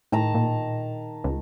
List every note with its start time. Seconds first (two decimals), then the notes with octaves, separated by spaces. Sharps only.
0.12 A2 D#3 A5 A#5
0.35 A#2
1.24 C#2